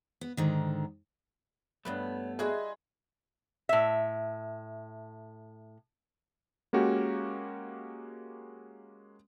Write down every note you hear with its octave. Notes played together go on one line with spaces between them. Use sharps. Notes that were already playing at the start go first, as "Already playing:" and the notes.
B3
G#2 D3 D#3
G2 G3 A3 B3 B4 C#5
G3 E4 F#4 G#4 D#5 E5 C6
A2 E5
G#3 A#3 C#4 F#4 G4